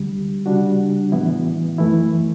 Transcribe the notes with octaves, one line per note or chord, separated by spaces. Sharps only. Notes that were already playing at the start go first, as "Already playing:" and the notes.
Already playing: D2 D3 G3
C#3 G3 D4 F#4
A2 E3 B3 E4
F#2 E3 A3 E4